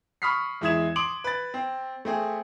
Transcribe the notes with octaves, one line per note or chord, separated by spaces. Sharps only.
B5 C#6 D#6 F6 B6 C7
E2 G#3 E4 D#6 G#6 E7
C6 D6 D#6 D7 F#7
B4 A6
C4
A3 C4 G#4